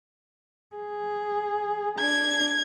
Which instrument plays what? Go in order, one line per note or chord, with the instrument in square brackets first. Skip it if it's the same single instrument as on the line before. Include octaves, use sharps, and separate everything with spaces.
[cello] G#4
[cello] D4 [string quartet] G#6